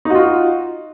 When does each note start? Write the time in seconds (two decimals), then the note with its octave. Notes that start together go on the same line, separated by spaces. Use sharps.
0.05 D#4
0.10 F#4
0.15 F4